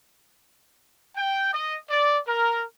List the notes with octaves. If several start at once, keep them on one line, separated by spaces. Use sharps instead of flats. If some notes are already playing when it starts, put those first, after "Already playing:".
G5
D#5
D5
A#4